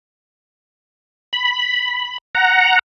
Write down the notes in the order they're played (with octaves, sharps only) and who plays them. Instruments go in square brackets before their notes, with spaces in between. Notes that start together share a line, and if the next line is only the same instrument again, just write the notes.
[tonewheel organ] B5
F#5 A#5